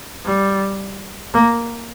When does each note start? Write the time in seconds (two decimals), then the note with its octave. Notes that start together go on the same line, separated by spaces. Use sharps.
0.25 G3
1.33 A#3